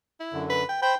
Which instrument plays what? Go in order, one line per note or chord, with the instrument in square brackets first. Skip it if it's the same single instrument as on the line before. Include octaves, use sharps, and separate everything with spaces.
[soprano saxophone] E4
[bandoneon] F#2 D3
[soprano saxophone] B4
G5
[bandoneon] C5 B5 G6 [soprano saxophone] G5